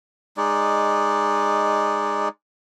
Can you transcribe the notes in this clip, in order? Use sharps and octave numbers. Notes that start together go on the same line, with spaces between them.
G#3 D#4 D5